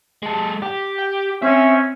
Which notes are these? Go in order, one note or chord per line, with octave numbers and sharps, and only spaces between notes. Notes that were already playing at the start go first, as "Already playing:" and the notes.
G#3 A4
G4
G5 G6
C4 C#4 E5